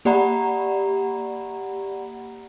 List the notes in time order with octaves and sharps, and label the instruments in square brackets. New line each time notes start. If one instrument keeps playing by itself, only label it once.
[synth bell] A#3 G4 D5 F#5 A#5 B5